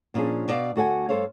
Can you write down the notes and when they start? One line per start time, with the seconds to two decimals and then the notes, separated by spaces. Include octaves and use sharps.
0.14 A#2 F3 C#4 D4 G#4
0.48 B2 D5 F5
0.76 D2 F#4 A4 F#5 G#5
1.09 G2 A4 C5 C#5 F5